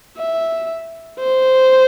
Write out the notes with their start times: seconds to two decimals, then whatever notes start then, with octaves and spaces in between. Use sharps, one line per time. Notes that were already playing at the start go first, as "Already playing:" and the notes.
0.18 E5
1.19 C5